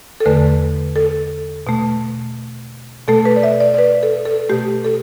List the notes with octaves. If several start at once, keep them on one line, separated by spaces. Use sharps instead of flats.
A4
E2 D3 A3 B4
A4
B2 A3
B2 A3 A4
B4
D5
E5
D5
D5
B4
A4
A4
B2 A3 G4
A4